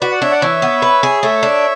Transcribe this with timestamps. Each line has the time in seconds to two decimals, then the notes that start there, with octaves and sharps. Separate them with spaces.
0.01 F#4 B4 D5
0.11 D5 F#5
0.21 D4 C#5 E5
0.31 D5 F#5
0.41 E3 C#5 E5
0.62 B3
0.82 B4
1.03 G#4
1.23 A3 C#5 E5
1.43 D4